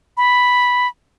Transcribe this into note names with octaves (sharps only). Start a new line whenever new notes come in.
B5